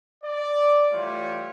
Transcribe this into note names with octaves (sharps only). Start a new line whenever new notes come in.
D5
E3 G3 A3 F4 C#5